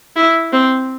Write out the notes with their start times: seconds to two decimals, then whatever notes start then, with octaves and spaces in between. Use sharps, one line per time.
0.16 E4
0.52 C4